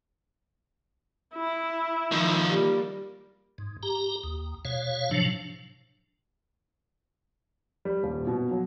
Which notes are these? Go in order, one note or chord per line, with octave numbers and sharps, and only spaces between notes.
E4
D#3 F3
G3 A#3
G#2
G4 A#5
D#2
B2 C#5 F5
A2 C3 F3 F#3 D4
G3
D#1
B2
F#3